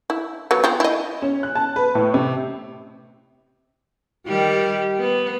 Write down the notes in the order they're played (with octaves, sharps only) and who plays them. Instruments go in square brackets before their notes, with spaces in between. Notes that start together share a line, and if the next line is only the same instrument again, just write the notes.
[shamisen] E4
F#3 B3
B3 C4 F4
E4 D#5
[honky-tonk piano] C#4
F#6
A5
B4
A2
C3
[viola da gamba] D#3 G3 G4
B3